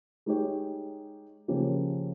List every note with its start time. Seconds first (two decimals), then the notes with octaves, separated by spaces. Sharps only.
0.26 G#3 D#4 G4 C#5
1.48 C#3 F3 A#3 C#4 G4